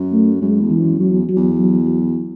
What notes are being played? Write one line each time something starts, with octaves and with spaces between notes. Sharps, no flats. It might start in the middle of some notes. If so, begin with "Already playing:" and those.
Already playing: F#2
A3
F#2 G#3
E2
E3
F#2
F#2 F#3
E2
F#3
E2
F#3
F#3